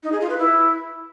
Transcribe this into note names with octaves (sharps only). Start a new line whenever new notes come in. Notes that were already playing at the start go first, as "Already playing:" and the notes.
D#4
G#4
F4
B4
E4